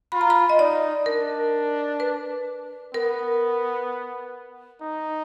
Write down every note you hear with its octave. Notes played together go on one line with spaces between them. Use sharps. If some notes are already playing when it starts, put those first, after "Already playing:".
F4 B5
A#5
B5
D#5
D#4 D5
D4 A#4
B4
B3 A#4
D#4